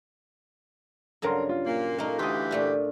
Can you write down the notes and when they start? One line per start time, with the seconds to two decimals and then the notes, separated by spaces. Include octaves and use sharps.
1.22 G2 C#3 F#3 A4 A#4 C6
1.49 F4
1.65 A#2 A#3
1.98 A3 D#4 A#4 A#5
2.19 D2 E3 F4 G4 G5 C6 D#6
2.51 A#2 A3 D4